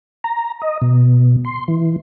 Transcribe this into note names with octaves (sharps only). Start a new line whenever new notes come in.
A#5
D#5
B2
C6
E3